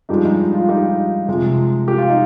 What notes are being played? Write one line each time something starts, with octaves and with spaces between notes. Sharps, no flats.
G2 F3 G#3 D#4 G4
D#4
F4
D#4 G4
C3 F3 G#3
G4
F4
D#4